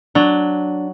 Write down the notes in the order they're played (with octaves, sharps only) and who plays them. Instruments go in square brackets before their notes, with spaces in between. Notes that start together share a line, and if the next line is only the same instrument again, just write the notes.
[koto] F#3 [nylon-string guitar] D4